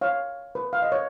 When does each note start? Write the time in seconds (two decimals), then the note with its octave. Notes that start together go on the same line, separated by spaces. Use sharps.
0.01 C#5 F5
0.55 B4
0.73 F5
0.82 D#5
0.92 C#5